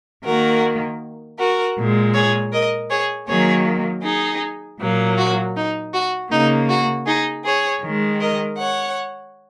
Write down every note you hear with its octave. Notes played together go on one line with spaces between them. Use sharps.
D#3 A#3 F#4 A#4
F#4 A#4
A#2 G#3
G#4 C#5
A#4 D#5
G#4 C#5
D#3 F#3 A#3 G#4 C#5
D#4 G#4
A#2 F#3 A#3
F#4
D#4
F#4
C#3 A#3 D#4
F#4
D#4 G#4
G#4 C#5
D#3 G#3
A#4 D#5
C#5 F#5